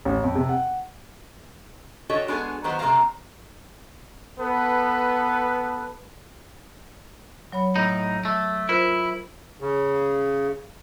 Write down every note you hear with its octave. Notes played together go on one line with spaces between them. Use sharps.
A1
F2
C3
F#5
D4 F#4 G4 A4 C#5 D#5
G#3 B3 D4 F#4 G#4 A4
D#3 F#3 B3 G4 C5 A#5
C3 A3 A#3 F5 A#5
B3 A4 B4
F#3 C#5 B5
A2 D#4
A3
E4 F4 A#4 C5
C#3